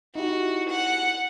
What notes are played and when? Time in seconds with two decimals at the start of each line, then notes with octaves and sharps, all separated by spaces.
0.15 D#4 E4 F#4 G4
0.70 F#5